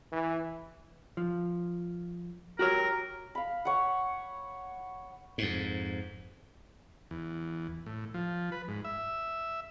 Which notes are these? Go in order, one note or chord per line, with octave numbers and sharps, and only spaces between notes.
E3
F3
F#4 G4 A#4 C#5
F5 B5
C#5 F#5
F2 G#2
E2
A2
F3
B4
G#2
E5